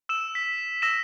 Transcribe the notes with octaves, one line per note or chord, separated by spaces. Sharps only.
E6 E7
B6
E6 A#6 E7